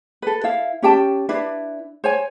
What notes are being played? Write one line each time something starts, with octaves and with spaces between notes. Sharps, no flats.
A4 B4
E4 F5
C#4 G4 G5 A5
D4 E4 B4
C5 C#5 G#5